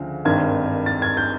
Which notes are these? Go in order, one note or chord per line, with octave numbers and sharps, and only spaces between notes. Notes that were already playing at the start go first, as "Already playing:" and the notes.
Already playing: D2 C#3 F3
G#1 G2 D#3 G#6
A6
G#6
G6